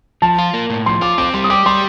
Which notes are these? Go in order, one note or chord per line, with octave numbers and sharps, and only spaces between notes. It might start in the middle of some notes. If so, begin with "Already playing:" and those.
F3 A5
F4
A#3
A2
F3 C6
F4 D6
C4 D6
G3 C6
D#6
G4 D6
G3 C6